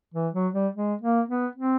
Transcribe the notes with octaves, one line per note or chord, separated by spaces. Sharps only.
E3
F#3
G3
G#3
A#3
B3
C4